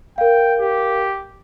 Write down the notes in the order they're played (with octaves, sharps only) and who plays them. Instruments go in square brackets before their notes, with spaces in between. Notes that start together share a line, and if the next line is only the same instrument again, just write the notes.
[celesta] A#4 F5 [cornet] G5
[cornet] G4